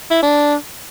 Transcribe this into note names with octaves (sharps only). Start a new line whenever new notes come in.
E4
D4